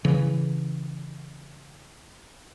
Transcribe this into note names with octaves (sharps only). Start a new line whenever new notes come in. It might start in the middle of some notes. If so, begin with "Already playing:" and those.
C#3 E3